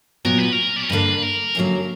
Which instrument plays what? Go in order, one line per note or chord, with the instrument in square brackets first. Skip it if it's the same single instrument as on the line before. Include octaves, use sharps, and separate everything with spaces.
[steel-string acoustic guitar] A#2 F#3 B3 [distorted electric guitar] A#4
[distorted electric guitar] B4
A#4
D5
C#5
[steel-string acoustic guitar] G2 D3 A#3 D4 [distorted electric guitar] B4
[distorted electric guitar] A#4
[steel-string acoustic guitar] F#2 D3 F#3 A#3